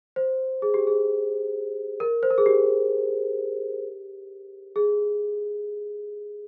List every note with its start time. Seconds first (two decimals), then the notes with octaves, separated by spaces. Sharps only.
0.16 C5
0.62 G#4
0.74 G4
0.87 G#4
2.00 A#4
2.23 C5
2.30 A#4
2.38 G#4
2.46 G4
4.76 G#4